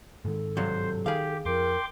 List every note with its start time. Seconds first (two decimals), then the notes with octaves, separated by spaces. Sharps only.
0.25 G#2 D#3 G#3 A4
0.57 G2 C3 F#3 C5
1.06 D#3 G4 G#4 F5
1.45 F2 F3 A#4 G5 C6 D6